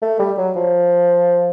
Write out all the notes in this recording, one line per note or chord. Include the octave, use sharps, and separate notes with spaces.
A3
G3
F#3
F3